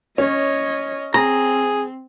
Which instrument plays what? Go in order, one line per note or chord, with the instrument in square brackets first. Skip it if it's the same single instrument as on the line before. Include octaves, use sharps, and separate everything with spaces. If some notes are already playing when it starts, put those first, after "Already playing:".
[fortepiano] C#4 [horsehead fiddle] C#5 D#5
[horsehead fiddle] C4 [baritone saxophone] G#4 [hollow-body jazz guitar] A#5